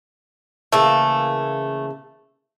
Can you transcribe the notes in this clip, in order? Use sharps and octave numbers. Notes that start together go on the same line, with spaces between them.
C#3 E3 A3 A#3